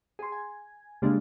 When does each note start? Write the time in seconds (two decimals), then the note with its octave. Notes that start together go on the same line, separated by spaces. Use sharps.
0.19 G#4 C6
0.32 G#5
1.02 C#3 G3 G#3 A#3 D4